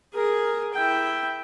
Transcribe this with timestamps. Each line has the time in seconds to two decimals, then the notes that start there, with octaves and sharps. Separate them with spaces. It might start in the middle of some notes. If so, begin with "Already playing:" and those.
0.14 G#4 A#4
0.74 E4 G5